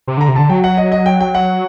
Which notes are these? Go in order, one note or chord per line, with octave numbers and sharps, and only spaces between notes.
C3
D3 A#5
C3
D3 A5
F#3 G5
F#5
D#5
D#5
G5
G5
F#5